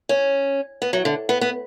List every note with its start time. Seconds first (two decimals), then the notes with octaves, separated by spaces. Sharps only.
0.09 C#4
0.82 B3
0.93 F#3
1.05 D3
1.29 B3
1.41 B3